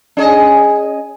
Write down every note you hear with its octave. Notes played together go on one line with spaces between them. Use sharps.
C#4 G#4 D#5